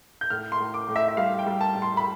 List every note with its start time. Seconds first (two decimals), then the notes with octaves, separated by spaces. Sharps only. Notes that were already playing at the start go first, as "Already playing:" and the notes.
0.21 G6
0.30 A2 F6
0.52 C6
0.60 A2
0.74 D6
0.88 A2
0.96 E5
1.08 E5
1.17 G3 F5
1.39 G5
1.46 G3
1.61 A5
1.75 A2
1.82 C6
1.97 B5